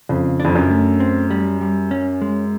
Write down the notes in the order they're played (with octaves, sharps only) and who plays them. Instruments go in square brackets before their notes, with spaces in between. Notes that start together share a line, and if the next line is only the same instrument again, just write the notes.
[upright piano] F2 [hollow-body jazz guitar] C#3
[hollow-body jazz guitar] D4
[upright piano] F2
F#2
[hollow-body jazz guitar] A3
C4
G3
G3
C#4
G#3